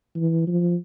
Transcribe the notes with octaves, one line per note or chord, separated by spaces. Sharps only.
E3
F3